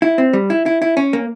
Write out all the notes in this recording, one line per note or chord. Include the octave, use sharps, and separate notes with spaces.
E4
C4
G3
E4
E4
E4
C#4
A#3